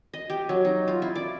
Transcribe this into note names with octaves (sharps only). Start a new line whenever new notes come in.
D#5
G4
F#3
D#4
F4
E4
D5